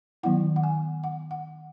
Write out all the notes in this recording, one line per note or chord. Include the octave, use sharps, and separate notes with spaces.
D#3 F#3 B3 E4 F#5
F#5
G#5
F#5
F#5